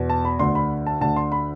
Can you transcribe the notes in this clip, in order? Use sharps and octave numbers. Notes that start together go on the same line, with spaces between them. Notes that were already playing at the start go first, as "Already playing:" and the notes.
Already playing: E2 B2
A5
B5
D2 D3 C6
B5
A5
D2 D3 A5
C6
B5